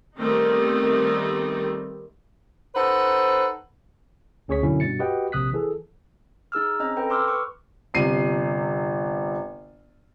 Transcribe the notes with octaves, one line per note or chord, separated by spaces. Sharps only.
D#3 G3 A3 B3 C4 D#4
D#4 A4 B4 C5 F#5
D2 C#4 G#4 C#5 C#6 B6
F#2 B2 D3 C#4 E4
G2 B2 A6 C#7
F#4 G4 B4 D#5 F#5 G5
A#1 C3 D#6 F#6 B6
E3 G#4 A4
D#4 G#4 E6 F6
C4 C#4 D#5 A#5
A4 B4 G5
B4 C6 D6 E6 F6
B4 C#6
G1 C3 C7 D#7